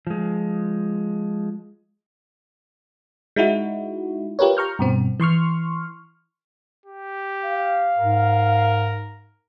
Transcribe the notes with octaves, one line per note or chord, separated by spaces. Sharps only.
F3 G#3
G#3 D#4 E4 F#4
F4 G4 A#4 B4 C#5
A#5 C#6 F6 G6
G2 B2 C4
E3 C6 C#6 F6
G4
F5
G#2 A#4